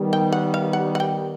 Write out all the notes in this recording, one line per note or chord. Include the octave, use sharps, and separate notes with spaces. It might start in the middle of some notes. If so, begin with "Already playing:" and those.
Already playing: D#3 G3 B3
G5
F#5
F5
F#5
F#5
G5